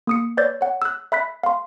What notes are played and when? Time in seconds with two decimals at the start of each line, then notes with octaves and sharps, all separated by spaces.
0.07 A#3 D#6 C#7
0.37 B4 C#5 D5 E6 G6 A6
0.61 C#5 F#5
0.82 E6 F#6
1.12 E5 B5 F#6 B6
1.43 F5 C6